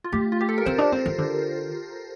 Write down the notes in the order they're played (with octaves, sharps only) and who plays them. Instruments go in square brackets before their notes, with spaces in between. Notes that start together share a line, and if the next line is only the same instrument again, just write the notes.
[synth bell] F4
[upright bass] A3 [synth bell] G4
[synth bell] F4
G4
A4
A#4
[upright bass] C4 [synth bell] C5
[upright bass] D4
C4
E3
D3